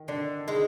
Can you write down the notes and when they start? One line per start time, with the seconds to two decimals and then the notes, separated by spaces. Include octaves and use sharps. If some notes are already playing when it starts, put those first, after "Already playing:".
Already playing: D#3
0.08 D3 D4
0.47 G#3 D#4